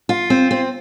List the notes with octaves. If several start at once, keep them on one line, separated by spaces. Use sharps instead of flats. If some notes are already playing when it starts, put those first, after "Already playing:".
F4
C4
C4